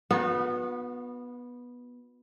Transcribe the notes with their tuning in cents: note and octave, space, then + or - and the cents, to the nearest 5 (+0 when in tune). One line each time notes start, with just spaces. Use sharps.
B3 -10 D#4 -35 F#4 -45